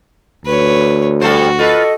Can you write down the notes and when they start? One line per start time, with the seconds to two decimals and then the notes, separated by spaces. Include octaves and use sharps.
0.46 D2 B4 C#5
1.21 G3 F#4 A4 C5
1.59 F4 A4 B4 D#5